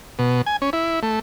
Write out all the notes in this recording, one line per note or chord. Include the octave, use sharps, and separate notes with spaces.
B2
G#5
C#4
E4
A3